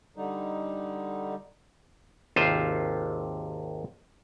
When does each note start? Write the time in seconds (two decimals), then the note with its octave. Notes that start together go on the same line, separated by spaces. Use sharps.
0.17 D3 G3 D#4
2.36 G#1 D#2 C3 F4 C5